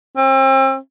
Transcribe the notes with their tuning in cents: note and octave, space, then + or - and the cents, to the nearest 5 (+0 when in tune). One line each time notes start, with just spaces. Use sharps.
C4 +35